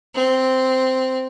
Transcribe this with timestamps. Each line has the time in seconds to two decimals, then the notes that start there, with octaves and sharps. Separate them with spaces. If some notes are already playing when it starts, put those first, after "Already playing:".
0.15 C4